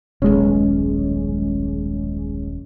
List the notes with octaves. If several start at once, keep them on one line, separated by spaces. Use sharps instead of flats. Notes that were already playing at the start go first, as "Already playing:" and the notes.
D#1 B1 G#3 C#4